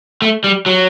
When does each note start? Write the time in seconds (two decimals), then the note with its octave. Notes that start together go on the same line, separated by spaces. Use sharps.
0.22 A3
0.44 G3
0.66 F#3